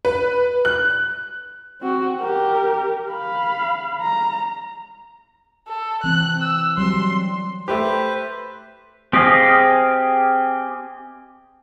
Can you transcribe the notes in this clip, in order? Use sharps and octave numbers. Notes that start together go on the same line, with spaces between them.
B4
F#6
C4 F#4
G4 A#4
F5 B5
A#5
A4
E3 C4 F#6
E6
F#3 G3 C4 C6
A3 G4 B4 C5
C4 G4 G#4 D#5 F5